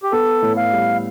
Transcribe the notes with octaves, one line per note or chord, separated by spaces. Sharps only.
G4
B3 A4
A2
F5
G3